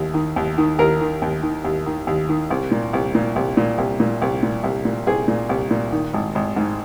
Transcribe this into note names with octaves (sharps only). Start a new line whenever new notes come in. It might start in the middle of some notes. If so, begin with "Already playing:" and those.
Already playing: D#2
D#3
D#2
D#3
D#2 A#4
D#3
D#2
D#3
D#2
D#3
D#2
D#3
C2
A#2
C2
A#2
C2
A#2
C2
A#2
C2
A#2
C2
A#2
C2 G#4
A#2
C2
A#2
D#3
G#1
G#1
G#2